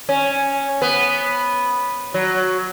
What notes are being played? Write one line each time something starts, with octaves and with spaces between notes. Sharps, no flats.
C#4
B3
F#3